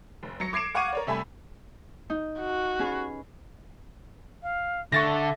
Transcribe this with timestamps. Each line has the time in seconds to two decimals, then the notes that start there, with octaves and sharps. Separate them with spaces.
0.23 F1
0.40 F#3 A#6 C#7
0.53 D6 G#6 C7 D7 E7
0.75 F5 F#5 C#6 D6 G#6 D#7
0.93 A#4 C#5 D5
1.07 C3 G3 A3 E5 G#5 B5
2.10 D#4
2.40 F#4
2.79 C#4 G#4 B4
4.43 F5
4.92 D3 A4 E5 C#6 A6 A#6